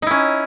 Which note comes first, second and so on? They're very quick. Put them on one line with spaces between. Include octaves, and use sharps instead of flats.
D#4 E4 C#4